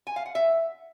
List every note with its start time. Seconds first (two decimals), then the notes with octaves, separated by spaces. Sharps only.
0.07 G#5
0.16 F5
0.26 F#5
0.35 E5